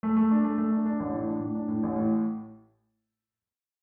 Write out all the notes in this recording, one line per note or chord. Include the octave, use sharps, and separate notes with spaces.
A3
A3
D4
A3
A3
D4
D4
A1
A2
D4
A2
D4
A2
A1
A2